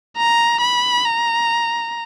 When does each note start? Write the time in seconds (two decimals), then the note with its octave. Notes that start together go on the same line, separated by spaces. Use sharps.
0.17 A#5
0.61 B5
1.05 A#5